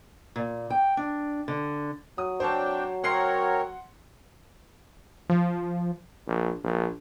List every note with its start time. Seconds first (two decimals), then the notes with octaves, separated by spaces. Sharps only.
0.36 A#2
0.70 G5
0.97 D4
1.48 D3
2.18 F#3 D#6
2.40 C4 D4 C5 C#5 G5 A5
3.04 C4 A#4 C#5 F#5 C6 C7
5.29 F3
6.27 A#1
6.64 A#1